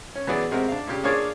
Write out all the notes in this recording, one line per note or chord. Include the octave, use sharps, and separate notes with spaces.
C#4
E3 F#3 B3 G#4 D5
C3 G#3 C4 F#4 A#4
D4 F5
A#2 C#3 G4
A#3 D4 F4 G#4 C#5 D5